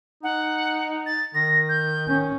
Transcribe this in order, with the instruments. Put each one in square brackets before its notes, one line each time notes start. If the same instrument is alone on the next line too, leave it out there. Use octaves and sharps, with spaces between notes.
[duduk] D#4 [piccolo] F#5
[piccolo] A6
[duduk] D#3 [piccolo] A#6
[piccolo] G6
[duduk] D#3 [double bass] C#4